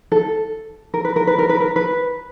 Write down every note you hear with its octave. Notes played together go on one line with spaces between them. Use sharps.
A4
A#4
B4
A#4
B4
A#4
B4
A#4
B4